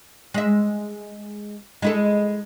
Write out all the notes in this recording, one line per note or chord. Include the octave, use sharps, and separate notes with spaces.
G#3 E5
G#3 E4 A4